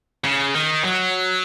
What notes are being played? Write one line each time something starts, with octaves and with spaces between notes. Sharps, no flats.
C#3
D#3
F#3